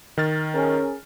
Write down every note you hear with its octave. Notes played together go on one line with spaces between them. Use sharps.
D#3 F6 A6
C#4 G#4 A#4